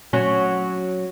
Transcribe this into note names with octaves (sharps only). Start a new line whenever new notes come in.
F#3 C#4